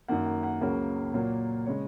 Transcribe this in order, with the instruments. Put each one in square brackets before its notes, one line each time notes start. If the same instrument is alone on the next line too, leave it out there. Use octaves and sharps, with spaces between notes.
[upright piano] F#2 D#3 A#3 F#5
F#5
F#5
C#2 C#3 F#3 A#3 A#4
A#2 F#3 A#3
C#3 G#3 C#5